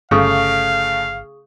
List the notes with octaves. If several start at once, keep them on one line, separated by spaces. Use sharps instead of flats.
G1 C#3 A3 G#4 F5 C#6 D#6